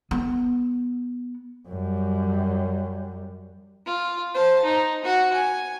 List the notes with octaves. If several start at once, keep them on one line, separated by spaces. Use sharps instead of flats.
B3
F#2 G3
F4
C5 A5
D#4
F#4 F#5
G#5